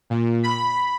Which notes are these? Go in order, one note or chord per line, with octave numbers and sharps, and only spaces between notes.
A#2
B5